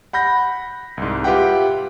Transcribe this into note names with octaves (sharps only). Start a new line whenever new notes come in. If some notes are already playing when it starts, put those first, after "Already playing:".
F#5 B5 G6 A#6
C2 G#2
F4 G4 B4 E5 F#5 G5